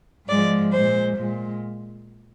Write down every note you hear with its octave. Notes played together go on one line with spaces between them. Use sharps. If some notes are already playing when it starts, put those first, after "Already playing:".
G#2 F3 G#3 D5
A#2 G#3 C5
A#2 G#3